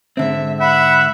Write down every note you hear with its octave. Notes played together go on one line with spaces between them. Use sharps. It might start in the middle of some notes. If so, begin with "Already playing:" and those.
G#2 D3 C4 E5
E5 F#5 B5